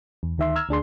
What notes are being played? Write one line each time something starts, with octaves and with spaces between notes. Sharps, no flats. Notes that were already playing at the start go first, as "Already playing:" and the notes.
E2
D2 D#3 E5 C6
A#5 E6 F6 G#6
D2 D4 G#4 C6